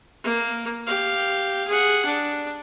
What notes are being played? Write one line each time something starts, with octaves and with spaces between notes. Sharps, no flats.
A#3
G4 F5
G#4 F#5
D4